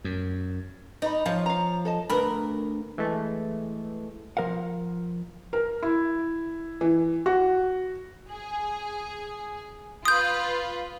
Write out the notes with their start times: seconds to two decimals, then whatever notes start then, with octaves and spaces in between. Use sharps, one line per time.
0.04 F#2
1.02 D#4 D5 D#5 B5
1.26 F3 C#5 F5
1.46 F5 A#5
1.85 A4 D#5 A5
2.10 D2 A#4 B4 B5
2.98 E3 G#3 A3
4.37 F3 A#4 F5 F#5
5.53 A#4
5.83 E4
6.81 E3
7.26 F#4
8.29 G#4
10.05 F4 B4 D#6 G6